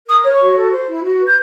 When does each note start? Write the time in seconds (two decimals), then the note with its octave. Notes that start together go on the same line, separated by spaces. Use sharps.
0.09 A#4 D#6
0.24 C#5
0.33 C#6
0.40 F#4
0.56 A4
0.72 C5
0.88 E4
1.04 F#4
1.20 B4
1.27 G6